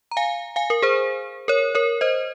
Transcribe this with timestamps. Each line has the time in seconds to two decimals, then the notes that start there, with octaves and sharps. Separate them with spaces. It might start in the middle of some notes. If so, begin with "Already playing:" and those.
0.11 A#5
0.17 F5 G#5
0.56 F5 G#5
0.70 A#4
0.82 G#4 C5
1.48 A#4 C#5
1.75 A#4 C#5
2.01 C5 D#5